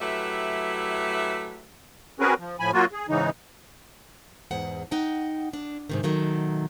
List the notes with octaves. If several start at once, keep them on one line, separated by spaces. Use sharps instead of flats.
F#3 A3 E4 G4 B4 E5
C4 C#4 F#4 G#4 A#4 B4
F3
A2 F3 G#5 B5
F#3 A#3 F4 F#4
G#4
G#2 C#3 E3 D#4
E2 G#2 F#5
D#4 F#5 G5
D4
G#2 C3 D#3
B2 D#3 F#3 A3